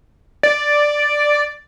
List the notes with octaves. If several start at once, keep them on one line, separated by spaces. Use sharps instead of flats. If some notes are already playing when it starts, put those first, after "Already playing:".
D5